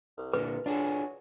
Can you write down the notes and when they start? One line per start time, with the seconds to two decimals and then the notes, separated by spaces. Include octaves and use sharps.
0.18 C2
0.34 A#2 D3 A#3 B4
0.66 F#3 D4 F4 G#4 A4